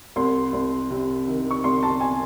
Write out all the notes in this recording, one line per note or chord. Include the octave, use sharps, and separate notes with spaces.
C2 C6
C2
C3
D#3
C#6
C2 C6
A5
G#5